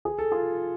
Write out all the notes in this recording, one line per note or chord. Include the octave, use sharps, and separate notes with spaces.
G#4
A4
F4 G#4